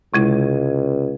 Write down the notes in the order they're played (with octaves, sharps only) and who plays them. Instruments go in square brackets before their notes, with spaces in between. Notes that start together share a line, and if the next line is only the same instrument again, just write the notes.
[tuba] C#2 [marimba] C3 G#3 E4